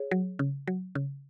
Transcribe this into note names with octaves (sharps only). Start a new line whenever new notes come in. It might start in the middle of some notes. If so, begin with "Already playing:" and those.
Already playing: G#4 C#5
F#3
C#3
F#3
C#3